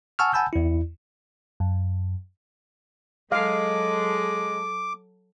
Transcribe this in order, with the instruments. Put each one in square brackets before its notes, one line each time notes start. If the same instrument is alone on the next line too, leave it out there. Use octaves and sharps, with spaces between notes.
[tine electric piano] F#5 G#5 A5 C#6 E6 F6
F#5 G#5 A5 B5 E6 G6
E2 E4
[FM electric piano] F#2
[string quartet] F#3 A4 [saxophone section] G#3 [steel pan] F5 [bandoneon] D6